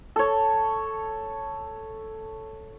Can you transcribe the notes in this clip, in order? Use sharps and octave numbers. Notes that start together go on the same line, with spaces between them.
A4 C#5